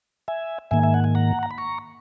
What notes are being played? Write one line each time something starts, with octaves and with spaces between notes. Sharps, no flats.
E5 G#5
G#2 D#3 A#3 E5 G#5
E5
F#5
G#5
F#5 A#5
A#5
B5
A#5 C#6